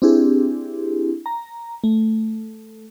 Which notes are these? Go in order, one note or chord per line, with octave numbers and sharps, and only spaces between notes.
C4 D4 E4 G4 G#4
A#5
A3